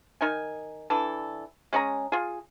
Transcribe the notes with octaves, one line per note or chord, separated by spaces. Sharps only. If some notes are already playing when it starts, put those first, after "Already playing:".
D#3 D#4 G#5
E3 D4 A4
G#3 C#4 G#4 A#5
F4 G#4